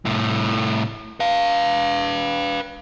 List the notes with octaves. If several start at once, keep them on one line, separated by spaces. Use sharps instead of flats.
C2 A2
B4 F5